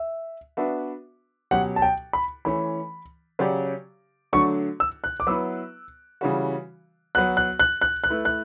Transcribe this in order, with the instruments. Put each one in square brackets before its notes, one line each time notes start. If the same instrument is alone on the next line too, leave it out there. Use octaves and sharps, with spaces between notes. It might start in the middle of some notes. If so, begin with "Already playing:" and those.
Already playing: [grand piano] E5
[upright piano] B3 D4 F#4 B4 E5
[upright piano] B2 F#3 C#4 G4 [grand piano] F#5
[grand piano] A5
G5
B5
[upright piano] E3 A3 C#4 [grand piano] B5
[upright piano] C#3 F#3 C#4 G4 D5
[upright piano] D3 F#3 A3 D4 F#4 [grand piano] C#6
[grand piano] E6
F#6
D6
[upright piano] F#3 B3 E4 B4 [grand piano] E6
[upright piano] C#3 E3 G3 C#4 F#4
[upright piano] F#3 B3 F#4 [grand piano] F#6
[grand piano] F#6
F#6
F#6
F#6
[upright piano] A3 E4 B4
[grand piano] F#6